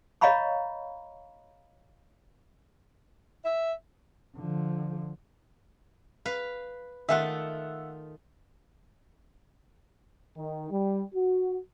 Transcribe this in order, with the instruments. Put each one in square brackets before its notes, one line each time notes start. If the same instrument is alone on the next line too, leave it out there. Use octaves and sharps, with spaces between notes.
[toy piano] C#5 D#5 F5 A#5 B5 C#6
[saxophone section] E5
[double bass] D3 F3
[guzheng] B4 F5
[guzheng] D#3 A3 F4 [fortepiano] E5 F#5
[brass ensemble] D#3
G3
F#4